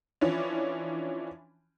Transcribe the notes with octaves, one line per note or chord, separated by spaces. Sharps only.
E3 F3 C#4 D4